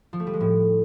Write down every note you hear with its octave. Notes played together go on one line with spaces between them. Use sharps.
F3
A3
G3
G#3
A2